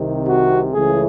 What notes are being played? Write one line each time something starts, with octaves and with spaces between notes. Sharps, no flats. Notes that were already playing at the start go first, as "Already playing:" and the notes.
Already playing: C2 C3 D#3
F#4
C#2 C#3 E3 A3 G#4